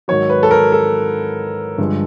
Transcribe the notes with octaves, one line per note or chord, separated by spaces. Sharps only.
G#2 D#3 F#3 C#5
B4
A4
A#4
A4
G2 D3 F3 G#3